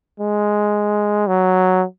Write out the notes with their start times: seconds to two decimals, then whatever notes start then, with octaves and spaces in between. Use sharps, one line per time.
0.20 G#3
1.27 F#3